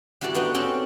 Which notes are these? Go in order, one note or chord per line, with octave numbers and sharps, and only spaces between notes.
G3 E4 F#4 A4 D5
B3 D4 D#4 F#4
C4 C#4 D#4 A4 D5